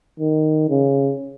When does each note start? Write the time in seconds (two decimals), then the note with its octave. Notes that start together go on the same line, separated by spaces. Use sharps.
0.20 D#3
0.70 C#3